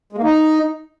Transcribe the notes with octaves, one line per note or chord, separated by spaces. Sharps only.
G#3
A#3
D#4